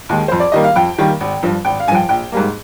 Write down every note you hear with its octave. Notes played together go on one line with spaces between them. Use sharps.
D#2 D#3 G#3
F2 C5
D5
D#3 G3 A#3 D#5
F5
F2 G5
D#3 G3 A#3
G#1
G2 F3
G#1 G5
F5
G2 F3 G5 G#5
A#1 G5
G#2 G3 A#3